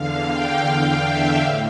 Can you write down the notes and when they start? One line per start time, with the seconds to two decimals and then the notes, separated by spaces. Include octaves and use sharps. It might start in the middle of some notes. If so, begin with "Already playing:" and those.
Already playing: E2 D3 F5
0.28 G5
0.65 F5
1.02 E5
1.40 A2